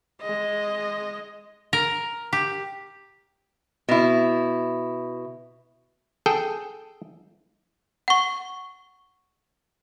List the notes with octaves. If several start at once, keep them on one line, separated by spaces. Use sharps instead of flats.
G#3 D#5
A#4
G4
B2 E4
G#4 A4 G5
F#5 C#6